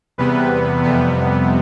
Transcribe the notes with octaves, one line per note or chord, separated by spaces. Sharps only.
E2 C3 G3 B3 B4
F2 C3 G3 B3